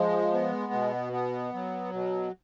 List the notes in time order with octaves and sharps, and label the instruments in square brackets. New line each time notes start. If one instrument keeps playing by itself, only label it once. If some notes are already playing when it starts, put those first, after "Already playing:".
Already playing: [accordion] F3 G#3
B3
B2
B3
F#3
B2